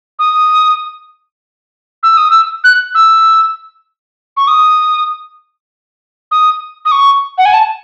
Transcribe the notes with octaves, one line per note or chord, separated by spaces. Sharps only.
D#6
E6
D#6
E6
F#6
E6
C#6
D#6
D#6
D#6
C#6
F#5
G#5
A5